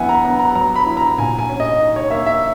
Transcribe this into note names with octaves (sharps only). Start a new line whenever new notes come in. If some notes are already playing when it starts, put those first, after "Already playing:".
Already playing: F#2 E3 B3 E5 F#5 G#5
A#5
B3 A#5
A#5
F#3 A#5
B5
E4
A#5
A#2 G#5
G#5
C#4
D#5
D#4
C#5
A#3 E5
E5